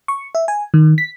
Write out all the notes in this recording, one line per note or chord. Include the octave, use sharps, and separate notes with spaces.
C#6
E5
G#5
D#3
B6